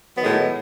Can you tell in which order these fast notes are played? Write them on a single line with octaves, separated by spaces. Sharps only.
F#3 B3 D#3 G#3 A2